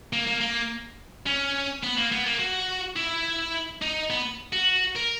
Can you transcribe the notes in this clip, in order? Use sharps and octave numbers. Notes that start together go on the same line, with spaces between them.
A#3
A#3
A#3
C#4
B3
A#3
B3
A#3
F#4
E4
D#4
B3
F#4
A#4